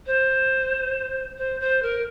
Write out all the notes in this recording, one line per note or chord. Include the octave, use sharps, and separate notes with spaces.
C5
C5
C5
A#4